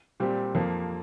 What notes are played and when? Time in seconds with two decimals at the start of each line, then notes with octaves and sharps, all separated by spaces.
0.20 A#2 G3 C4 G4
0.55 F2 F3 A#3